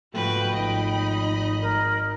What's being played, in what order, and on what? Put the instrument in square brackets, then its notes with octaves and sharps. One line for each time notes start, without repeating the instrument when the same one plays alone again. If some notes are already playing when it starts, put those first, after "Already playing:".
[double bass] G#2 [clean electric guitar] F3 G#3 A3 [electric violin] F#4 B4 [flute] G5
[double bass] G#1 D#4 [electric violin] D#5 B5
[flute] A#4